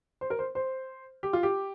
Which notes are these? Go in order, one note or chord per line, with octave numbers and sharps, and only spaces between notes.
C5
A#4
C5
C5
G4
F4
G4